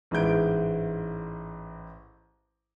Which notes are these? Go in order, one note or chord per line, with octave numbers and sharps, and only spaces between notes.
A1 G#2 E3 G#3 G6 D7